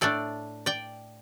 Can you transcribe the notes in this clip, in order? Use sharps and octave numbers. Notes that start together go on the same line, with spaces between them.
A2 A3 D4 A4 D5
D5 G5